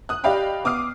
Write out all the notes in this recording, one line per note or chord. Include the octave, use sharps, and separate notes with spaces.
D#6 F#6
G4 D5 D#5 F5 G5 B5
B3 D6 D#6 F6 C7